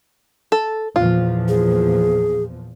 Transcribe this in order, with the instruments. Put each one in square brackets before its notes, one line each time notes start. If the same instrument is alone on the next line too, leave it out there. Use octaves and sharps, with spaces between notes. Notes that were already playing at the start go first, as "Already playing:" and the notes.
[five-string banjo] A4
[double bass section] E2 A#2 F3 [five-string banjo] F4
[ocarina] G#4